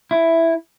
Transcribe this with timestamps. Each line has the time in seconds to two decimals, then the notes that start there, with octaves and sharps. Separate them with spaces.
0.11 E4